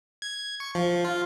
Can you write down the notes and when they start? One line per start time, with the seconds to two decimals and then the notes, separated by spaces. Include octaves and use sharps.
0.22 G#6
0.60 C#6
0.75 F3
1.05 F4